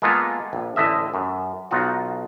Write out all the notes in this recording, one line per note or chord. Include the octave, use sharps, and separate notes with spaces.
G#3 A#3 B3 F4 A4
A#1
A1 D3 D#5 E5
F#2
B1 D#4 F4 F#4